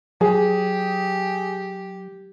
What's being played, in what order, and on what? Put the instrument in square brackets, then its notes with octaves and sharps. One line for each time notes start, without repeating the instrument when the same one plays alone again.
[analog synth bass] F#3 [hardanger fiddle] G4 [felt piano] G#4